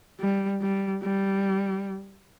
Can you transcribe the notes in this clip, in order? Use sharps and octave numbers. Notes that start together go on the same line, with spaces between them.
G3
G3
G3